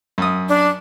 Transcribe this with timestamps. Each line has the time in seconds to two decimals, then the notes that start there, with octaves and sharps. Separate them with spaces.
0.18 F#2 D#6
0.49 D4